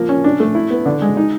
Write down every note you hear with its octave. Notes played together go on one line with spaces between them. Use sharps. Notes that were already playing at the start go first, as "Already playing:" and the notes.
Already playing: F3 A#3
C#4
D4
A3
E4
B3
D3
G#3
D#4